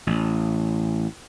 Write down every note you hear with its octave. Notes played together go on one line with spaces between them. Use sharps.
A1